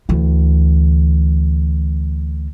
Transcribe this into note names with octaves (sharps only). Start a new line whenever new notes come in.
D2 E3